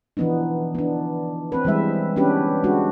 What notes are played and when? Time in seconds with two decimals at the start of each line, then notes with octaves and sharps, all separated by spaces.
0.17 E3 F3 B3 D4 D#4
0.75 B3 D4
1.52 C4 B4
1.64 E3 G3 G#3 E5
2.16 B3 C#4 D4 G4 B4
2.64 G#3 D4 F#4